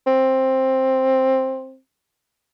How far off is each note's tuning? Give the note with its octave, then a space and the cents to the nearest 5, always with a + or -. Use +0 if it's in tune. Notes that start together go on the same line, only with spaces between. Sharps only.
C4 +10